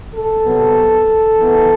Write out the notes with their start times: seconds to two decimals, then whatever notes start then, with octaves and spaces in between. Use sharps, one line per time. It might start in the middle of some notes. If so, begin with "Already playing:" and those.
0.14 A4
0.45 C3 F#3 B3
1.35 E3 B3